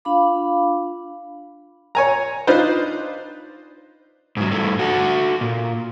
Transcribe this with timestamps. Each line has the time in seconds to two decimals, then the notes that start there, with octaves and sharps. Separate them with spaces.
0.05 D4 F4 F5 B5 D6
1.95 C#5 G#5 A#5
2.47 D4 D#4 F4 B4 C5
4.37 G#2 F#3
4.49 G2 A3
4.79 F#4 A4
5.41 A#2